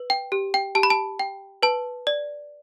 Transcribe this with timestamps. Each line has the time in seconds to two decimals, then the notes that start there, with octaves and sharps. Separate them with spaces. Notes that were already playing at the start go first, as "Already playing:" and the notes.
Already playing: B4
0.10 G5
0.32 G4
0.54 G5
0.75 G4 A5
0.83 B5
0.90 A5
1.19 G5
1.63 B4 A5
2.07 D5